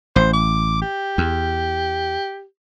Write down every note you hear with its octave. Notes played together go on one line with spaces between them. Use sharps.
A1 C5
D6
G4
E2